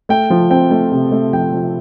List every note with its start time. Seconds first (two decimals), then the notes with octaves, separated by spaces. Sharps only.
0.09 A3 G5
0.30 F3
0.50 C4 G5
0.71 A3
0.92 C3
1.12 A3
1.33 F3 G5
1.53 F3